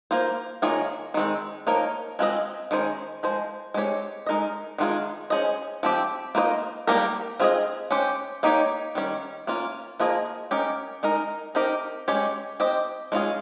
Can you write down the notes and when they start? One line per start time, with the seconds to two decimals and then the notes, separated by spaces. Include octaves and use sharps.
0.11 A#3 F4 C5
0.62 D#3 A#3 F4 G#4 C#5
1.14 D#3 G#3 C4
1.67 F3 A#3 D#4 A#4 C#5
2.19 G#3 C4 F4 A#4 D#5
2.71 D#3 G#3 C#4 G#4 C5
3.23 F3 G#3 C5
3.74 G#3 C4 G4 C#5
4.27 G#3 D#4 A#4 D#5
4.78 D#3 G#3 C#4 F4 G#4
5.30 C#4 G#4 C5 D#5
5.83 F3 C4 G4
6.35 A#3 F4 C5 D#5
6.87 G3 A#3 C#4 G4 A#4
7.39 C4 F4 G#4 D#5
7.91 C#4 G4 C5
8.43 A#3 D#4 G4 C#5
8.95 D#3 G3 C#4
9.47 A#3 C#4 F4
10.00 F3 A#3 F4 G#4 D#5
10.51 C#4 G4 A#4 D#5
11.03 G#3 D#4 A#4 D#5
11.55 C4 D#4 G4 A#4
12.08 G#3 C#4 G4 C#5
12.60 C4 G4 C5 D#5
13.12 G#3 C#4 F4 G#4